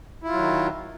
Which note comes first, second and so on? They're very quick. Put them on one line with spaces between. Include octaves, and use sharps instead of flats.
E4 F4 F#3 D#3